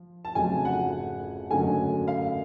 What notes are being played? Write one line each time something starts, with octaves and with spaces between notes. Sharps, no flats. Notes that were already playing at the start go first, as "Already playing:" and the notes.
Already playing: F3
A5
F1 F2 C#3 F#3 G#5
F#5
F#1 F#2 D3 F#3 A3 G#5
F5